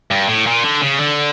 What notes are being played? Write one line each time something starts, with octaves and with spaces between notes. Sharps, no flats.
G2
A2
A#2
D3
C#3
D3